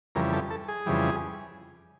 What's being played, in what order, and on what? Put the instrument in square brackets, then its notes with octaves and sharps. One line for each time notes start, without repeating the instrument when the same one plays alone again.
[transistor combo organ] F2 C#3 E3 G3 A#4
A4
A4
G#4
F2 C#3 E3 G3